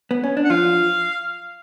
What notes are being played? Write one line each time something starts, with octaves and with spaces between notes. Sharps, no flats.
B3
C#4
D4
F#5
F3 F4 F5